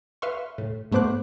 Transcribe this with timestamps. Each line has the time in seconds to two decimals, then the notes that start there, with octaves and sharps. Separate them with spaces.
0.22 B4 E5 F5 C6 C#6
0.58 A2
0.91 G#2 A3 B3 C5 D6 F#6